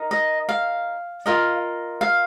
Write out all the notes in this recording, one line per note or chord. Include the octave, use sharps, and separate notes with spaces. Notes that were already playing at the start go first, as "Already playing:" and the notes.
Already playing: D#4 A#4
D#5
F5
F4 A#4 D#5
F5